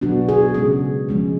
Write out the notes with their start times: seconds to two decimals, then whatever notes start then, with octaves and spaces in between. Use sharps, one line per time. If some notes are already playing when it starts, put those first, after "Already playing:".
0.01 B2 F#3 B3 D4 F#4
0.29 G#4
0.54 C#3 G#3 C#4 G#4
1.09 F3 G#3 C#4